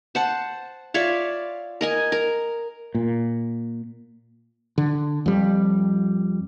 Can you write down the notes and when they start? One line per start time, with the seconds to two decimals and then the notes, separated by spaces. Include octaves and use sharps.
0.15 C5 F#5 A5
0.94 F4 C#5 D5 E5
1.81 A#4 D#5 G#5
2.12 A#4
2.94 A#2
4.78 D3
5.26 F2 G3